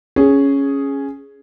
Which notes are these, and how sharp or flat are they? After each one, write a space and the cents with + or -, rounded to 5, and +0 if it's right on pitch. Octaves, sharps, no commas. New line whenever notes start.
C#4 +0 G#4 +0